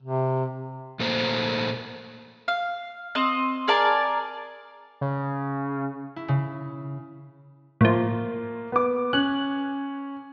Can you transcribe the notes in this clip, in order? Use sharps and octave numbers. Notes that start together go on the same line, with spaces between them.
C3
A#2 A3 A#3 C5
F5
C4 D#5
G#4 A#4 D5 A5
C#3
E4
C#3
A2 F3 A#3
B3 D6
C#4 F#6